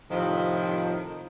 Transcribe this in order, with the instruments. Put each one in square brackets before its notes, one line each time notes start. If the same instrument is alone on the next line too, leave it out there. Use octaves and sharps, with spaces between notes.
[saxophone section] A2 C3 D#3 F3